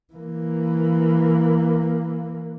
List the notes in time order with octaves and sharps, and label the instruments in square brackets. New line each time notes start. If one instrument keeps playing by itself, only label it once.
[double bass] E3 A#3